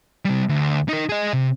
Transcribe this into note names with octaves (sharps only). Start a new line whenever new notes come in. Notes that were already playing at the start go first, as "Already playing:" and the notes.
C3 G3
D2
D#4 A#4
G#4 D#5
C3